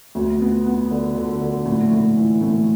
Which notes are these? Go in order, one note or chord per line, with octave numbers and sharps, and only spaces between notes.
D2
B3
B3
D3
D3
D3
A2
A2
E3
A2